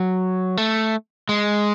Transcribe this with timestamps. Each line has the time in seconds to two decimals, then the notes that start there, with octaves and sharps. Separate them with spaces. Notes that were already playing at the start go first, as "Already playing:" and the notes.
Already playing: F#3
0.57 A3
1.29 G#3